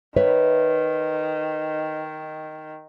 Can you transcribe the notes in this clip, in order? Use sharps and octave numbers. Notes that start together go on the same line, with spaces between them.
D#3 B4 C#5 E5